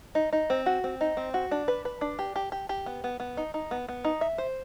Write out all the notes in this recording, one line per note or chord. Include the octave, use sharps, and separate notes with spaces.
D#4
D#4
C4
F#4
C4
D#4
C4
F#4
D4
B4
B4
D4
G4
G4
G4
G4
B3
B3
B3
D#4
D#4
B3
B3
D#4
E5
C5